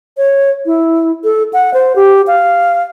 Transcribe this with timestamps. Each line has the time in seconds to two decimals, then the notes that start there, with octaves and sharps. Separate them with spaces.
0.17 C#5
0.66 E4
1.24 A4
1.53 F#5
1.74 C5
1.96 G4
2.27 F5